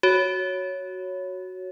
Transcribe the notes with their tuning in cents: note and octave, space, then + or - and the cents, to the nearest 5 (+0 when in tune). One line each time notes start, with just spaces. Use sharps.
F#4 +0 C#5 -5